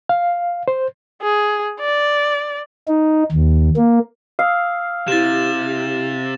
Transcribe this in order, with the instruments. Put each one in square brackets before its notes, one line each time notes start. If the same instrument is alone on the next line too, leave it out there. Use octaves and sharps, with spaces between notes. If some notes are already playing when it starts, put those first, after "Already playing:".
[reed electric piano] F5
C5
[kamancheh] G#4
D5
[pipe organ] D#4
D#2
A#3
[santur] F5 [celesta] D#6 E6 C7
[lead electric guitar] C3 [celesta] E4 G4 [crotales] A6 E7